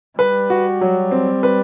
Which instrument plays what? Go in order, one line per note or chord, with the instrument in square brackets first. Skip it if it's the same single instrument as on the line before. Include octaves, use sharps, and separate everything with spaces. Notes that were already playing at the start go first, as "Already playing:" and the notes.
[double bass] G3 [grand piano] B4
[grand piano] F#4
F#3
C4
B4